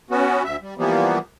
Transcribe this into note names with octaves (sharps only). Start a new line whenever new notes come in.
B3 C#4 F#4
D2 E5
G3
E3 F3 G3 A#3 B3